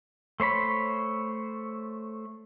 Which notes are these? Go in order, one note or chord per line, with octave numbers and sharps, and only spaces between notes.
A3 C5 C#5 B5